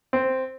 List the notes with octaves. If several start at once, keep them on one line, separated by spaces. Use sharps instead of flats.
C4